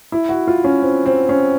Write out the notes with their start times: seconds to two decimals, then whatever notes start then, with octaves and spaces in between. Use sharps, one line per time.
0.12 E4
0.29 F#4
0.47 F4
0.64 C#4
0.82 C4
1.06 C4
1.29 C#4